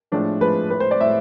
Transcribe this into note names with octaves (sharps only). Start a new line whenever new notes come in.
A2 F3 G#3 D4
A2 F3 G#3 B4
A2 G#3 B4
C5
D5
A2 G#3 E5